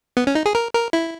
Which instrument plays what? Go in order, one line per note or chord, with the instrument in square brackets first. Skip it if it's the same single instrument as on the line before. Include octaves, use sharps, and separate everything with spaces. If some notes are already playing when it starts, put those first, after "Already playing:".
[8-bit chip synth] B3
C#4
D#4
G#4
A#4
A#4
E4